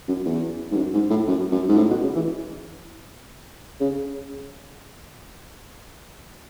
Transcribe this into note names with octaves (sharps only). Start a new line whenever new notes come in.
F#2
E2
G#2
F#2
G#2
A2
F#2
F#2
G#2
A2
B2
C#3
E3
C#3